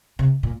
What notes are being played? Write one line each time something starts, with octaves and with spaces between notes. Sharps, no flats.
C3
A#2